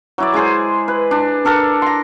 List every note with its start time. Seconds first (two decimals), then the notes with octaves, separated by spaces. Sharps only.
0.18 F#3 E4 D5
0.34 G#3 E4 G#4 C5
0.88 B4
1.11 D4
1.45 D4 A4 A#4 D5
1.82 A#5 C6